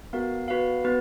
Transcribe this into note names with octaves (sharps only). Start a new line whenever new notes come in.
B3 F#4 A#4 F5
B3 F#4 B4 F5
B3 F#4 B4